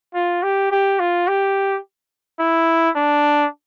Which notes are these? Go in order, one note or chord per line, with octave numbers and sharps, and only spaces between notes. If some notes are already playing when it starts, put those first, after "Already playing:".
F4
G4
G4
F4
G4
E4
D4